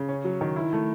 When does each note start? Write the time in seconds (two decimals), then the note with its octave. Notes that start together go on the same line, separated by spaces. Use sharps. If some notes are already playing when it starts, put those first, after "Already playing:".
Already playing: C#3
0.09 C#4
0.24 F#3
0.41 D#3
0.56 E4
0.73 A3